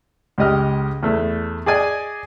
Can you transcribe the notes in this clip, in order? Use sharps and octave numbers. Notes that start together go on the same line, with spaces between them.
C#2 G4 D#5 F6
E2 A3
G#4 D5 D#5 G#5